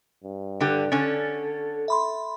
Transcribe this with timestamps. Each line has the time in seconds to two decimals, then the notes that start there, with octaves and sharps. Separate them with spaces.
0.24 G2
0.60 D3 G4
0.92 D3 C#4 A4 A6
1.88 E5 B5 C6